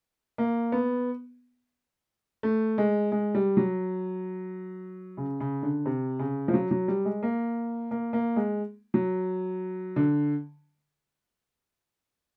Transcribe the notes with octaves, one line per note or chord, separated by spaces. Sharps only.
A#3
B3
A3
G#3
G#3
G3
F#3
C#3
C#3
D3
C3
C#3
F3
F#3
F#3
G3
G#3
A#3
A#3
A#3
G#3
F#3
D3